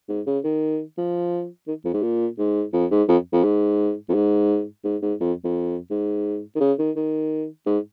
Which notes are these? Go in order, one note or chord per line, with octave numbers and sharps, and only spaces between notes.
G#2
C#3
D#3
F3
D#3
F2
G#2
A#2
G#2
F2
G#2
F2
F2
G#2
F2
G#2
G#2
G#2
F2
F2
G#2
D#3
C#3
D#3
D#3
G#2